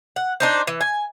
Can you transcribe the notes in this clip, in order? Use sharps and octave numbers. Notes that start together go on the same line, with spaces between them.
F#5
D4 D#4 C5
E3
G#5